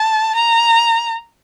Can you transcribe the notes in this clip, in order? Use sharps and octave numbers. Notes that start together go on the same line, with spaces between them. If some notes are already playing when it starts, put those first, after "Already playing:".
Already playing: A5
A#5